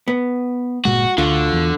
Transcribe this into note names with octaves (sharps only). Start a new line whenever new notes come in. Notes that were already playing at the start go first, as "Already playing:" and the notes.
B3
G1 A#2 G#3 F#4
D2 D3 F4 F#4
E2